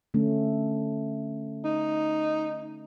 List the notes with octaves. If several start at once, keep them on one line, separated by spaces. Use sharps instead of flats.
D3 A3 C#4
D#4